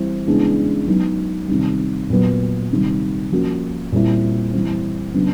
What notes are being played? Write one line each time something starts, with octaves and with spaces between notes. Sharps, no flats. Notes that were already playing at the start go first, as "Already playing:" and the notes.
Already playing: E3 G3 C4 E4
C#3 E3 G#3 B3 D4
F#3 B3 D#4
C3 D#3 G3
A#2 F#3 B3
C3 D#3 G3
F3 A#3 C#4 F#4
A#2 G3 C4 E4
E3 G3 C4
C#3 F#3 B3 D4